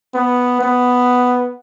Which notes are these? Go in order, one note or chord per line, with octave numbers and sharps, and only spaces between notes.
B3
B3